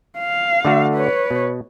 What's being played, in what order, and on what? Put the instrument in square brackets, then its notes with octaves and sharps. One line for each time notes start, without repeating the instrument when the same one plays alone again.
[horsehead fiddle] F5
[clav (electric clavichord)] D3 A3 F#4
[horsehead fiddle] B4 C#5
[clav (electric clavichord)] B2